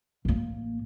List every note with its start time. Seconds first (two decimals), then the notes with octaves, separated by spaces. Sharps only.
0.25 A1 A#3